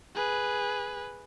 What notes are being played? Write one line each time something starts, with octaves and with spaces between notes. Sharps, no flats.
G#4 B4